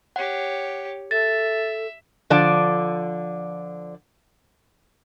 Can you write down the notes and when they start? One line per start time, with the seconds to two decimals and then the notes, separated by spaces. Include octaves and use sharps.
0.16 G4 C#5 F#5
1.11 A4 E5 A6
2.30 D3 F3 D5 A5